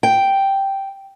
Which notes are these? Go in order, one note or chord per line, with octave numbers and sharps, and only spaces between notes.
G5